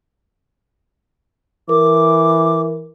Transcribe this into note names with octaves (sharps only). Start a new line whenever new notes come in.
E3 A#4 D6